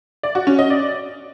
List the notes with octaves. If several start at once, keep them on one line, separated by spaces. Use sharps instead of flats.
D5
F#4
C#4
D#5
D5